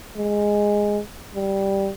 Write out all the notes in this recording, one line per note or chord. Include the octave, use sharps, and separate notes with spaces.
G#3
G3